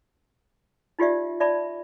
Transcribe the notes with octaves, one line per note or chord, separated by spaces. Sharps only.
D#4 F4 G4 D5 E5
D5 E5 A5 B5